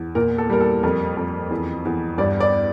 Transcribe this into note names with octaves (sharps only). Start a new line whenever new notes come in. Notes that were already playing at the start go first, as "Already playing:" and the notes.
Already playing: E2
A#2 A#4
A4
G3 A#4
A4
F2 A#4
F2
E2
E2
G2 D5
D5